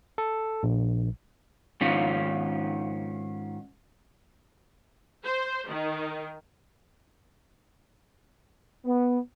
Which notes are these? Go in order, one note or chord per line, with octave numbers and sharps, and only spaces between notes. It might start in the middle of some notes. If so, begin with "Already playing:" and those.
A4
A#1
G#2 D#3 C#4 F4
C5
D#3
B3